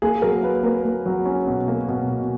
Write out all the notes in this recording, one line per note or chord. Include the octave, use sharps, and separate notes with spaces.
A#3 G#4
F#3 A#4
A#3 B4
A#3 A#4
A#3
F#3
C#4
B2
A#3
B2
B2